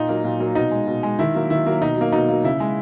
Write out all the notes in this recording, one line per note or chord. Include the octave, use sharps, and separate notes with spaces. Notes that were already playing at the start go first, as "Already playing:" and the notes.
Already playing: A#2 D#4
F#3 A#3
A#2
F#3 A#3
B2 D#4
G#3
B2
G#3
D#3 E4
F#3 A#3
D#3 E4
F#3 A#3
B2 D#4
F#3 A#3
B2 D#4
F#3 A#3
C#3 E4
G#3